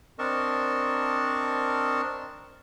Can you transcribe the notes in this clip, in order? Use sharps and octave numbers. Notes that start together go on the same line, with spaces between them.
C4 D4 A#4 D#5 A5 C#6